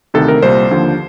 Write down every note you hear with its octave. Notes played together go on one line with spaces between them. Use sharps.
D2 C3 D#3 A4
A#4
C2 A#2 G3 C5
D#2 D3 F3